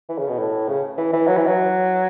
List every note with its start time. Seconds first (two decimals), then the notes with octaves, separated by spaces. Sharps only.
0.09 E3
0.19 C#3
0.29 B2
0.39 A2
0.68 C#3
0.98 E3
1.13 E3
1.28 F#3
1.37 E3
1.47 F#3